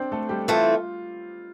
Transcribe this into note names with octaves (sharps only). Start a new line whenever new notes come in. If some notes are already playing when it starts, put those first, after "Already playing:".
Already playing: C4 D4 C5
A3 A4
G3 G4
E3 A3 C4 F4